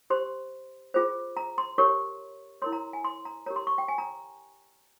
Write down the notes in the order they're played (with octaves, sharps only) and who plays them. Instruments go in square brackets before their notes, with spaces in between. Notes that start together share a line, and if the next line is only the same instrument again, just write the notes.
[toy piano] G4 C5 C6
F4 G#4 C5
A#5
C6
G4 A#4 C#5 C#6
E4 A#4 C#5 C6
A#5
G#5
C6
A#5
G4 A#4 C#5 A#5
C6
C#6
G5
G#5
A#5